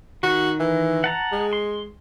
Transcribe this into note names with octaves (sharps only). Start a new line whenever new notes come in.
D#3 F#4
E3
F#5 A5 A#5
G#3
C6